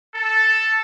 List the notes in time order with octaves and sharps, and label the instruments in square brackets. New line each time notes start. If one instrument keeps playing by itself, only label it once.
[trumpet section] A4